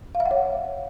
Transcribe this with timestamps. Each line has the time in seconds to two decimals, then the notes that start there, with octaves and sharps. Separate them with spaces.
0.15 F5
0.20 E5
0.26 F#5
0.31 C#5